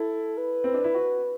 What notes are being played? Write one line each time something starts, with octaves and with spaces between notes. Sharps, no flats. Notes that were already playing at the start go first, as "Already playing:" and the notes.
Already playing: E4 A4
B4
C4
D4
E4
F#4